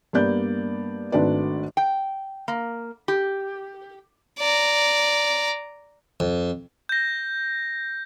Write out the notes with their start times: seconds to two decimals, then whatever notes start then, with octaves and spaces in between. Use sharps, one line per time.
0.13 G2 A#3 B3 D5 G6
1.12 G#1 A3 D4 F#4 B4 D5
1.77 G5
2.48 A#3
3.08 G4
4.39 D5 A#5
6.20 F2
6.89 G6 A#6